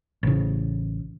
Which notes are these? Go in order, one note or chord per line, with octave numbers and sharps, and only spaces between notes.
A1 C#3